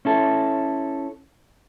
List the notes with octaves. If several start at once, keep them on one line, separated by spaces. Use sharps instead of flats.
C#4 E4 A4